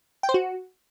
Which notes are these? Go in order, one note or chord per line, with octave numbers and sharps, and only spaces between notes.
G5
C5
F#4